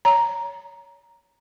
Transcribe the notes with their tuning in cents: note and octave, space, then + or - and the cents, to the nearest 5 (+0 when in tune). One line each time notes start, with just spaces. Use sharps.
C#5 +15 A#5 +0